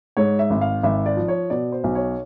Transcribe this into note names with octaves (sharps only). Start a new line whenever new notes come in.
G#2 C#5
E5
G#1
F5
G#1 E5
D5
F3
C#5
B2 D5
C5
B1
C#5